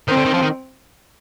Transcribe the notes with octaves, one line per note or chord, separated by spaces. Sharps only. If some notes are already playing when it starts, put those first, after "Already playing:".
D#3 C4
D3
D#3
F3
D#3